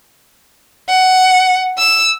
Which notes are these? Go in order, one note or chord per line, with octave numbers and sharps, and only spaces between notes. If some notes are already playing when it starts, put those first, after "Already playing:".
F#5
E6